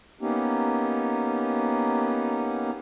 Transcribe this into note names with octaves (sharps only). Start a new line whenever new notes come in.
A#3 B3 C#4 D#4 G4